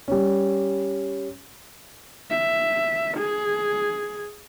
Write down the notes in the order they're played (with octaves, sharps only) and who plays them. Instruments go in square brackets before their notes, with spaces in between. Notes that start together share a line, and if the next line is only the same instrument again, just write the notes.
[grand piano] G3 C#4
[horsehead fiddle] E5
G#4